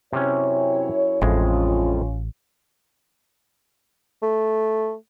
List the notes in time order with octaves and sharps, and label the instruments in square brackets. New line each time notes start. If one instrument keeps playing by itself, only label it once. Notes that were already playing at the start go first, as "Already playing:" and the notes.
[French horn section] F#2 E4 C#5 [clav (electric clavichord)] C3 C#4
[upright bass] A1 [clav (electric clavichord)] F2 A2 G#3 [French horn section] C#4 F4
[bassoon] A3